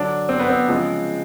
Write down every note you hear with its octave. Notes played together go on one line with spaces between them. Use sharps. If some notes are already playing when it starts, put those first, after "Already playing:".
Already playing: D3 F#3 D4
C4
B3
C4
C#3 F3 G#3